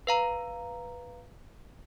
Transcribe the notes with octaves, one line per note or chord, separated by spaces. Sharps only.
B4 F5 A#5